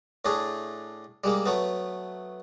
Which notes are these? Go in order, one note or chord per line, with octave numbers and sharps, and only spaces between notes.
A2 A3 D4 G#4
G3 G#3 A#3
F#3 A3 B3